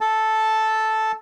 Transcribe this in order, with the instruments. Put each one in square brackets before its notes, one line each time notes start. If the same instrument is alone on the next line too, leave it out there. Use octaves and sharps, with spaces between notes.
[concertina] A4 A5